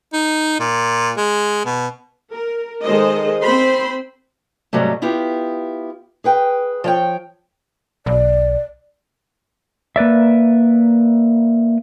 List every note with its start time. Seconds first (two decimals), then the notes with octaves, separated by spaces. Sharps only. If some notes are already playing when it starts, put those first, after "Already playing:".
0.13 D#4
0.60 A#2
1.17 G#3
1.65 B2
2.32 A#4
2.85 D#3 G#3 A4 C5 D#5
3.44 C4 C5 B5 C6
4.73 G#2 C3 F#3 G3 A3
5.02 B3 E4 F4 G4
6.24 G#4 B4 G5
6.84 F3 C#5 G5
8.06 B1 D5
9.96 A#3 B4 D5 E5